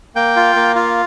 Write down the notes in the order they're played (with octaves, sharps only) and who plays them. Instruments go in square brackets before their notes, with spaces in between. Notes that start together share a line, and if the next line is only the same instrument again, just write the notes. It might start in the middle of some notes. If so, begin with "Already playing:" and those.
[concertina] A#3 G5
F4
A#3
F4